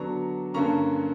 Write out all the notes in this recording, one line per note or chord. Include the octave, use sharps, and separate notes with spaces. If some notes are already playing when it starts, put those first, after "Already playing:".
Already playing: D3 F#3 B3 D4 A#5 C#6
G2 D3 A#3 C#4 A#5 C#6